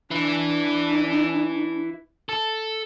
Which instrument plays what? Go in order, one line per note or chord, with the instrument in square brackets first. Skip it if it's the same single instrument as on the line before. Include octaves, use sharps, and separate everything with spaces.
[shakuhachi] D4 [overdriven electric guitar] E4 B4
[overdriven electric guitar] A4